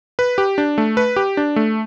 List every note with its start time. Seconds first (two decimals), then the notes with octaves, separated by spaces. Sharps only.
0.19 B4
0.38 G4
0.58 D4
0.78 A3
0.97 B4
1.16 G4
1.37 D4
1.56 A3